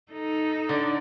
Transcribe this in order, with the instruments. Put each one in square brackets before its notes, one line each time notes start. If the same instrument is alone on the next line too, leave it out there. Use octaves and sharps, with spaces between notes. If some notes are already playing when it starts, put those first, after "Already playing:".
[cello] D#4 [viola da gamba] A4
[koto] D3 [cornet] D5